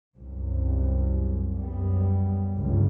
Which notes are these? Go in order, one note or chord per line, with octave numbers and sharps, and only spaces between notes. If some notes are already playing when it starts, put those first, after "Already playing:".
C2 F#2
F#2 G3 B3
G1 C#2 F#2